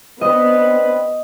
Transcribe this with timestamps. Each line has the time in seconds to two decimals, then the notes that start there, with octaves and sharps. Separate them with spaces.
0.21 B3 C4 D4 B4 D#5